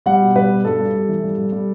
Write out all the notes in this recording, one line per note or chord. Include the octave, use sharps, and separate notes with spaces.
G3 F#5
B2
G3 B4
B2
G2 A4
G3
G3
E3
G3
G3
G3